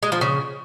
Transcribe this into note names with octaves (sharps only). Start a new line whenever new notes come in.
G#3
F3
C#3